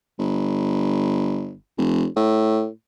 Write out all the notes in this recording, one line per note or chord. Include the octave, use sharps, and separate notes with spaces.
G1
F1
A2